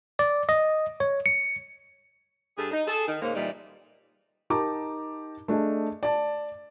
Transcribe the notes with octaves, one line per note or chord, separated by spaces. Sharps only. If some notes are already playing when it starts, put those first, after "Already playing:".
D5
D#5
C#5
C#7
G2 G#4 A4
D#4
G#4 A4
D#3
G#2 C#3 A#3
A#2 E3 G3 D#4
D#4 G4 A#4 A5 A#5 D6
A3 D4 G#4 D#5
D5 A5